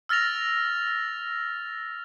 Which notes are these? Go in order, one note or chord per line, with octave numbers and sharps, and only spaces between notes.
E6 F6 A6 A#6 F7